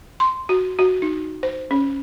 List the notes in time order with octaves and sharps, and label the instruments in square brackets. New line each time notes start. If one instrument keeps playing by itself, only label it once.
[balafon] C6
F#4
F#4
D#4
C5
C#4